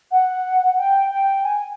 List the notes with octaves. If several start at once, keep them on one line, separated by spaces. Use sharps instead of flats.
F#5
G5
G5
G#5